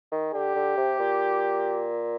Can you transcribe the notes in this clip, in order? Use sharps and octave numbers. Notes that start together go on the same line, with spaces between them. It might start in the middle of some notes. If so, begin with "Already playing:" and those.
D#3
D3 G4
D3
C3
A#2